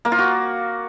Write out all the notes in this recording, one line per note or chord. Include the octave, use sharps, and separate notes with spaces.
A#3
F4
F#4